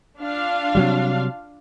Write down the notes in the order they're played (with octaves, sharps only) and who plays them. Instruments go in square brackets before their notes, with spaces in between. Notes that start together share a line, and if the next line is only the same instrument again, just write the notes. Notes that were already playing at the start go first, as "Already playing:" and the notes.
[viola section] D4 F4 F5
[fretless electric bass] C3 F#3 G3